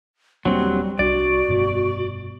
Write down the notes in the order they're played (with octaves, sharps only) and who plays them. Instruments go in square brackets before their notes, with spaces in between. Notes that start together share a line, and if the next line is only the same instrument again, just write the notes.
[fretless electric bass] D#1 A#3 D4 [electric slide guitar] F#3 C4 [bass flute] G3
[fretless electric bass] C2 D4 [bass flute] F#4 [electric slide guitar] D5
[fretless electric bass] F1 G2 B2